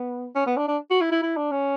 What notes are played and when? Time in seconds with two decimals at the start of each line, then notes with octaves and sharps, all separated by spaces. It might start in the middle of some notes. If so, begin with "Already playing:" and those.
Already playing: B3
0.35 C#4
0.46 B3
0.57 D4
0.68 D4
0.90 F#4
1.01 E4
1.11 E4
1.22 E4
1.37 D4
1.51 C#4